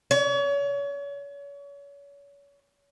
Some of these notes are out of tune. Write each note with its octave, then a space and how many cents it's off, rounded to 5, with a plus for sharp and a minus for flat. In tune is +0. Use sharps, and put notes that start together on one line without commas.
C#5 +35